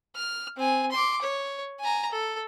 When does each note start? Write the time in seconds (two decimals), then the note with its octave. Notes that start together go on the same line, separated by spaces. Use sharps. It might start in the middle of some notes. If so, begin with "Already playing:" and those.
0.16 F6
0.57 C4 G#5
0.92 C6 D6
1.22 C#5
1.80 G#5 A#5
2.11 A4